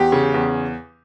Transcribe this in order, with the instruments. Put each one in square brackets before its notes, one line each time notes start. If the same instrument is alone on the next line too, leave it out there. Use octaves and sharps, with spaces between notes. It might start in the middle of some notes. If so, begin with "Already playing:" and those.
Already playing: [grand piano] E2 G4
C#3
E2